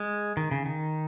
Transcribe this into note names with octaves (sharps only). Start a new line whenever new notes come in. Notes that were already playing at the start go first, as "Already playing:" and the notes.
Already playing: G#3
D#3
C#3
D#3